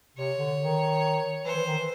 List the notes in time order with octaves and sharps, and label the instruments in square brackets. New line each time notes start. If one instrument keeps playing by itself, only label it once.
[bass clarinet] C3 [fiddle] C#5
[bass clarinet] D3
D#3
[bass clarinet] E3 [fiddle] C5
[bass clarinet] E3
D#3
E3